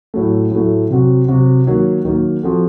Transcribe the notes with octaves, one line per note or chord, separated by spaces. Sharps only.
A2 F#3 A3
A2 F#3 A3
C3 F#3 C4 F#4
C3 F#3 C4 F#4
D#3 F#3 A#3
D#3 F#3 A#3
F3 C4 F#4 A4